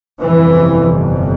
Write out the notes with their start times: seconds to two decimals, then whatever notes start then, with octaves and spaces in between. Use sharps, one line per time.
0.21 G1 F2 C3 E3